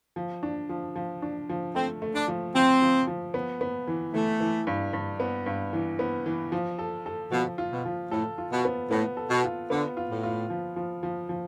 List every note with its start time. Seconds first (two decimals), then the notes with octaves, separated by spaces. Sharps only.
0.16 F3
0.43 D4
0.69 F3
0.96 F3
1.22 D4
1.49 F3
1.75 A3 C4
2.02 A3
2.15 D4
2.28 F3
2.55 F3 C4
2.82 F3
3.07 F3
3.34 B3
3.61 B3
3.87 E3
4.14 E3 A3
4.40 E3
4.67 G2
4.93 G2
5.20 B3
5.46 G2
5.73 E3
5.99 B3
6.26 E3
6.52 F3
6.79 A4
7.06 A4
7.31 B2 F3
7.58 F4
7.72 B2
7.85 F3
8.11 A2 A4
8.38 F4
8.52 B2
8.65 B3
8.91 A2 B3
9.17 A4
9.30 B2
9.44 F4
9.70 D3 B3
9.97 F4
10.10 A2
10.23 F4
10.50 F3
10.76 F3
11.03 F3
11.29 F3